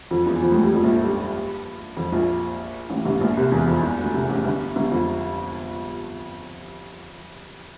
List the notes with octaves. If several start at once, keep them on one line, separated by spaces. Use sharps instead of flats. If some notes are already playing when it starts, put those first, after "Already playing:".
F2 F3
E2 E3
F2 F3
A2 A3
G2 G3
F2 F3
A#1 A#2
A2 A3
G2 G3
F2 F3
A#1 A#2
A1 A2
G1 G2
A#1 A#2
C2 C3
E2 E3
F2 F3
E2 E3
D2 D3
C2 C3
A1 A2
G1 G2
G1 G2
F2